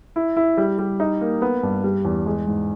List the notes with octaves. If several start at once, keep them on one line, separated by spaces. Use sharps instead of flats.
E4
E4
G3
G3
D#4
A#3
B3
G2
G3
E2
G#3
G#2